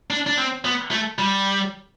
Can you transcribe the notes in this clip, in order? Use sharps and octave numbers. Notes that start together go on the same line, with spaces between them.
D4
D4
C4
B3
A3
G3